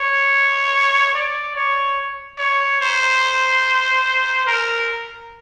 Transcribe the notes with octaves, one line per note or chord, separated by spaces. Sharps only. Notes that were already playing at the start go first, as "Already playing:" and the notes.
Already playing: C#5
D5
C#5
C#5
C5
A#4